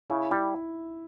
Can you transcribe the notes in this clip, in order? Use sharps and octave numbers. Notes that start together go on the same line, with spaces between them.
C#3 E4
G3 E4